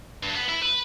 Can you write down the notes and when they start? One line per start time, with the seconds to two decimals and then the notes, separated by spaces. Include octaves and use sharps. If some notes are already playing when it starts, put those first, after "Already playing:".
0.23 G2
0.35 B3
0.49 E4
0.62 B4